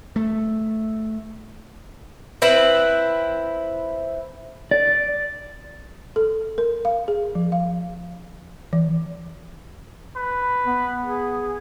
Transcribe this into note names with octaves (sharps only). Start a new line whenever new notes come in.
A3
C4 E4 B4
D5
A4
A#4
F5
G#4
F3
F5
E3
B4
B3
G#4